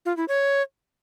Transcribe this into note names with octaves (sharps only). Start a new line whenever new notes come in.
F4
E4
C#5